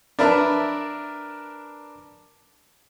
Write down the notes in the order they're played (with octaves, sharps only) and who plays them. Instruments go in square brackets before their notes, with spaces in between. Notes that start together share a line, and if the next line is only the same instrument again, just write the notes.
[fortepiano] D4 A#4 B4 E5 A5